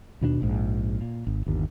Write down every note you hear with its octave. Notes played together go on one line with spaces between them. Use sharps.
D#2 B2 A#3 D4
A#1 G#2
A#2
G#1
G1 D#2